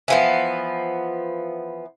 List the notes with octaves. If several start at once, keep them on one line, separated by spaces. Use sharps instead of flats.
E3 F3 B3